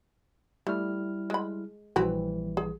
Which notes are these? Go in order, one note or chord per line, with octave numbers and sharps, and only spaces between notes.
G3 A3 E4 F6
G#3 B5
A#1 E3 G3 C4 F#4 B4
G#4